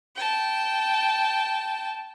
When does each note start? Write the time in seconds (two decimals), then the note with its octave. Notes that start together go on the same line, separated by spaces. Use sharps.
0.15 G5 A5